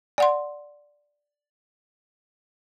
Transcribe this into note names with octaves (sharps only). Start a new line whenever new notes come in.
D5 F#5 C6